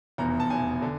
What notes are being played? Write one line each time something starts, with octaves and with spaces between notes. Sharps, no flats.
F1 E2 B2 A#5
A5
F1 E2 B2 G#5
D3